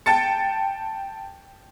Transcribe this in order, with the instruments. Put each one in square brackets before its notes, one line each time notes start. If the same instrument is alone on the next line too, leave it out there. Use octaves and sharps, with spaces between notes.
[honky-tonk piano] G5 A5 A6 C#7